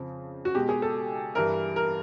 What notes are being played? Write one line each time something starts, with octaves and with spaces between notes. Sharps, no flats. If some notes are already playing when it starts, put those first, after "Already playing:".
Already playing: F2 C#3 F3
F#4
B2 G#3 G4
G#4
A4
G2 E3 G3 A#4
A#4